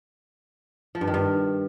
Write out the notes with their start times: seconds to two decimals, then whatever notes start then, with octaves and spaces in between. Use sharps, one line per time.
0.95 F3
1.01 G2
1.07 D#3
1.14 G2